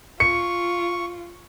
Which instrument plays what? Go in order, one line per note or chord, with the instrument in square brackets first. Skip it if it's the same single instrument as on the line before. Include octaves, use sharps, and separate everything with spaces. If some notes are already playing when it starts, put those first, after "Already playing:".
[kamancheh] F4 [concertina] C#6 [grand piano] C#7